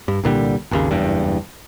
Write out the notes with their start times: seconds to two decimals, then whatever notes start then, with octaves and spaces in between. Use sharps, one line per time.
0.08 G2
0.24 C2 A#2 D3 G3
0.71 G#1 D#2 C#3
0.91 F#1 E2 G2